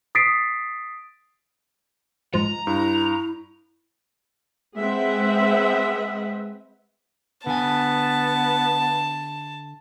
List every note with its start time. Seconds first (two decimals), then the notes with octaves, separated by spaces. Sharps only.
0.15 D#6 A6 B6 C7 D7
2.34 G#2 F3 A#5
2.67 G2 E4
4.78 G#3 C4 B4 E5 F#5
7.47 D3 B3 G#5 A5